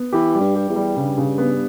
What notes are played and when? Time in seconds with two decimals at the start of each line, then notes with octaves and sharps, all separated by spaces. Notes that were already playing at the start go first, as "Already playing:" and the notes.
Already playing: B3
0.13 E3 G4
0.34 G3
0.40 G2
0.55 G4
0.69 E2
0.76 G3
0.96 G2 C#3
1.18 C#3
1.38 B3